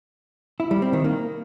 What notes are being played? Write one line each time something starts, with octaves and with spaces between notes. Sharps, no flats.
E4
G3
C4
D#3
A#3